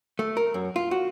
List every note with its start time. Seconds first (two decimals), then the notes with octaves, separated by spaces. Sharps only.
0.19 A3
0.37 A#4
0.54 F#2
0.76 F4
0.91 F#4